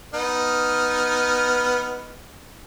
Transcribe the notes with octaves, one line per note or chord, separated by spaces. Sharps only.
B3 D#4 F6